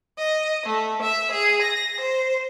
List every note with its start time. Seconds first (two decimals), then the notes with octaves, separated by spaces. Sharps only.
0.18 D#5
0.67 A3
1.02 E5
1.32 G#4
1.62 A#6
2.01 C5